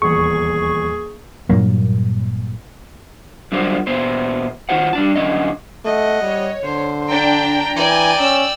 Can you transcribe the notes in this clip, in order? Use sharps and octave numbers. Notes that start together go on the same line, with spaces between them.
D#1 E2 G#4 C#6
G2 A#2 F#3 A#3
D3 F#3 G3 F4 A#4 C5
A#2 B3 C5
D#3 D#4 F4 C5 F#5
G3 D4 A5
F#2 D3 D#3 C#4 D#5
A3 D#5 F#5
G3 C#5
D3 C5
D4 G5 A#5
E3 D5 G5 G#5
C#4 E6